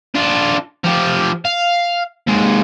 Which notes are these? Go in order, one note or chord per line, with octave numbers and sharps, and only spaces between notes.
D4 F4
F3 G4
F5
D#2 G#3